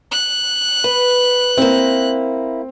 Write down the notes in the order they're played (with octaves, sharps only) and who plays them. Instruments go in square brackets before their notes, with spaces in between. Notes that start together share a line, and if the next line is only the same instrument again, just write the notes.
[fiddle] F#6
[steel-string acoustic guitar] B4
[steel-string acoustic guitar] A#3 E4 [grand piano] C4